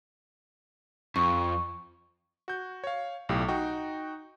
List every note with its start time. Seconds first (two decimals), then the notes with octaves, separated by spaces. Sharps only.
1.16 F2 C#6
2.48 F#4 G6
2.84 C#5 F5
3.29 B1 A2 G4
3.48 D#4 F#4 G5 C#6